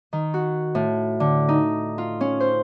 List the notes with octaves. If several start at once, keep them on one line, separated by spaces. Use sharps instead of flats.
D#3
F#4
A2
D3
D#4
F4
C#4
C5